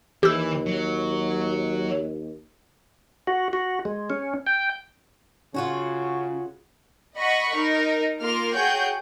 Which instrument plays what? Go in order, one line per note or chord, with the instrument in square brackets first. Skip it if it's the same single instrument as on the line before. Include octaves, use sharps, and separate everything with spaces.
[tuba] D#2 [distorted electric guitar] E3 [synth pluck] G4 E6
[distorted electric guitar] F#3
[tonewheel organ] F#4
F#4
G#3
C#4
G5
[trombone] C#3 [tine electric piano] C#4 F#5 [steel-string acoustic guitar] F4 F#4 C#5
[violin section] D#5 F#5 B5 C#6
D#4 A#4
A#3 F4 A#4 C6 F6
F#4 G#4 C#5 F#5 G5 G6